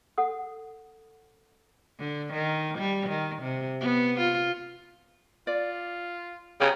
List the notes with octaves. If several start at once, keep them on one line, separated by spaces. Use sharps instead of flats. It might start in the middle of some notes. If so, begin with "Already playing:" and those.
A4 F#5 D#6
D3
D#3
G3
D#3
C3
B3
F4
F4 D5
C#3 G4 G#4 C#5 A#5